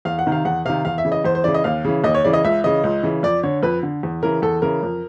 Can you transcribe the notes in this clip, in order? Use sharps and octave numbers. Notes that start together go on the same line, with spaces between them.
E2 F5
F#5
C3 D#3
F5
E2 F#5
C3 D#3 F5
E2 F5
E5
C#3 E3
D#5
E2 C5
C5
C#3 E3 D5
D#5
D#2 F5
C#3 E3
D#2 D#5
C#5
C#3 E3 D5
D#5
C#2 E5
C#3 E3 D#5
C#2
C#3 E3
F2 D5
D3 C#5
F2 B4
D3
E2
C#3 E3 A#4
E2 A4
C#3 E3 A#4
F2